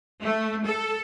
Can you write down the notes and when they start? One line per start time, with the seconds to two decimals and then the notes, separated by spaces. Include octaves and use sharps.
0.23 A3
0.66 A4